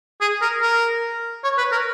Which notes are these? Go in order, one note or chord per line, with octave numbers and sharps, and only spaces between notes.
G#4
A#4
A#4
C#5
B4
A#4